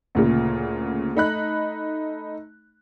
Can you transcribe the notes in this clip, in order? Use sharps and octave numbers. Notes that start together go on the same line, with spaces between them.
D2 A#2 C#3
A3 D#4 B5 F#6